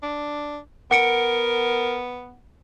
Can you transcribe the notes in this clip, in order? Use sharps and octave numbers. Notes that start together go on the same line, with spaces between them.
D4
B3 A#4 F#5 C#7 D7